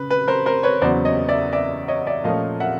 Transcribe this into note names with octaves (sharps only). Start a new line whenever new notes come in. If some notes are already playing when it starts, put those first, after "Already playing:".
Already playing: C#3 B4
B4
A#4 C5
A#4 C5
B4 C#5
E2 C#3 F#3 B3 C5 D5
C#5 D#5
D5 E5
D5 E5
C#5 D#5
D5 E5
A#2 F3 A3 C#4 D#5 F5
E5 F#5